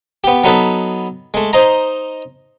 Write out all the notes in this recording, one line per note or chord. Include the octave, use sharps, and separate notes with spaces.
B3 G4
F#3 B3 D#4 A4 B4
G#3 A3
D#4 C5 D#5 A#5